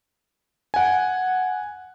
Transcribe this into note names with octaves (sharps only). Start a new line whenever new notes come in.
F#5 G#5